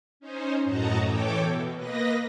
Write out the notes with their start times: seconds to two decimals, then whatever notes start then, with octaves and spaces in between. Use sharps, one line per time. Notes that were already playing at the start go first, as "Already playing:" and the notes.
0.20 C#4 D#4 C5
0.64 F#2 A2 F#4 D#5 A5 A#5
1.02 E3 A4 C#5 G5 D6
1.38 B2
1.75 A#3 B4 D#5 A#6